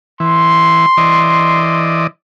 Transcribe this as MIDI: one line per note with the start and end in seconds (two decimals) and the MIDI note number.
0.20 0.86 52
0.20 2.05 84
0.97 2.07 52
0.97 2.07 74
0.97 2.07 75